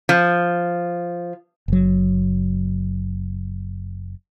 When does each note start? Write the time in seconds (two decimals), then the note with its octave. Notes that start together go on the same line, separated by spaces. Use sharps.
0.09 F3
1.68 F#1 F#3